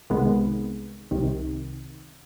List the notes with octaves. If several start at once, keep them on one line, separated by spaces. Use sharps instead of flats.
C2 C3 D#3 G#3 B3
C2 C3 D#3